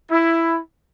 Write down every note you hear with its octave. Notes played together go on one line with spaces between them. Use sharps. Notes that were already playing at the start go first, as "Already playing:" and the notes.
E4